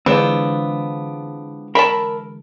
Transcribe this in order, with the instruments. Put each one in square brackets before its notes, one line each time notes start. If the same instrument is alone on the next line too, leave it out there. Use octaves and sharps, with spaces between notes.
[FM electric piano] D3 E3 G#3 [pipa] B3 [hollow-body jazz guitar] C4 D4 F4
[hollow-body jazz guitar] A#4 E5 [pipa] A5 B5